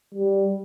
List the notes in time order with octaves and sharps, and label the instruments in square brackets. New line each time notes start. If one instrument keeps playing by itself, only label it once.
[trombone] G3